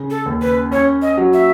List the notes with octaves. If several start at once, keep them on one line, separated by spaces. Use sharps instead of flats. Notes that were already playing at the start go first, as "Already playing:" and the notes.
Already playing: C#3
A4
D#2
B4
C#4 C#5
D#5
F#3
E5